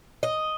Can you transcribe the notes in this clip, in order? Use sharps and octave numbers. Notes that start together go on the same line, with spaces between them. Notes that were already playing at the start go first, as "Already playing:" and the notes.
D#5